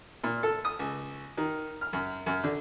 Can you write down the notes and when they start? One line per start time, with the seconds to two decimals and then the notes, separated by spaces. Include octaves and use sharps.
0.24 A#2
0.43 A4
0.65 D#6
0.79 C#2
1.37 D#3
1.81 F6
1.93 F#2
2.26 F#2
2.44 D3